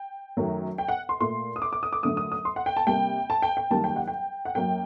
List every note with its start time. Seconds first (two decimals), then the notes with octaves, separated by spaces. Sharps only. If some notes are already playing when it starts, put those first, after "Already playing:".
Already playing: G5
0.37 F#2 D#3 F#3 A3
0.78 G5
0.88 F#5
1.09 C6
1.20 A#2 A3 C6
1.56 D#6
1.62 D6
1.73 D6
1.83 D#6
1.93 D6
2.03 F#2 D3 A3 D#6
2.17 D#6
2.32 D#6
2.45 C6
2.56 F#5
2.66 G5
2.77 A5
2.87 C3 G3 A#3 G5
3.30 A5
3.42 G5
3.57 G5
3.71 F#2 D#3 G3 A#3 A5
3.84 G5
3.96 F#5
4.07 G5
4.45 F#5
4.55 F#2 F#3 A#3 G5